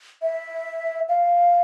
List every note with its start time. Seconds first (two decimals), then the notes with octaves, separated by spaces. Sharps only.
0.22 E5
1.09 F5